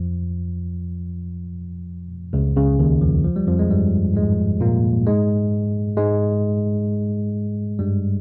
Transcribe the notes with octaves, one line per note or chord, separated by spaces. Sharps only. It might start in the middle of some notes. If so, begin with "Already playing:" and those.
Already playing: F2 F3
C#2 C#3
C#2 C#3
D#2 D#3
F2 F3
F3
G3
F2 F3
G#3
G2 G3
G#2 G#3
A#2 A#3
G#2 G#3
G#2 G#3
G2 G3